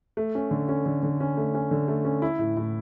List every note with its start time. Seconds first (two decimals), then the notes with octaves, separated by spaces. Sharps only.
0.17 A3
0.35 C#4
0.51 D3
0.69 C#4
0.86 D3
1.03 D3
1.20 C#4
1.37 A3
1.55 C#4
1.71 D3
1.88 A3
2.05 C#4
2.22 E4
2.39 A2
2.57 A2